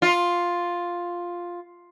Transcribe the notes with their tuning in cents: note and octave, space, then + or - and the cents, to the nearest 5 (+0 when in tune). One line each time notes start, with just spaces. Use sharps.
F4 +5